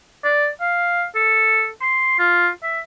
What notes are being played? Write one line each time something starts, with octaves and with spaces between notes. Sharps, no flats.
D5
F5
A4
C6
F4
E5